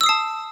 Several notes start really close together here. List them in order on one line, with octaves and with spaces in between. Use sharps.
E6 D#6 C7 A5